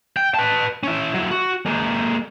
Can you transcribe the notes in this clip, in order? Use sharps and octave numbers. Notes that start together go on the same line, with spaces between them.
G5
B4 A5
C#4 E4
F#3 E4
F#4
G#3 A#3